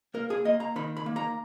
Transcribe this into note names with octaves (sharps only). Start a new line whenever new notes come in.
A#3 A#4
G#4
A#3 D#5
A#5
D#3 B5
B5
A#3
A#5